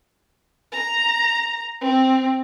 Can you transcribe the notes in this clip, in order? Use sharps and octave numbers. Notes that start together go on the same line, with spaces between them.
A#5
C4